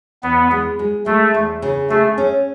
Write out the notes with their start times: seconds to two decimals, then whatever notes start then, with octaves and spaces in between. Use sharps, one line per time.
0.23 E2 B3
0.51 G#3
0.79 G#3
1.06 G#3 A3
1.34 E2
1.62 C#3
1.90 A3 G#4
2.18 C#4